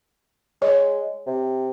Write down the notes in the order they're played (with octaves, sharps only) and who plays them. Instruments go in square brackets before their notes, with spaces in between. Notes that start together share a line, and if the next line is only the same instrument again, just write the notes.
[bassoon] G#3 [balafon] C#5
[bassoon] C3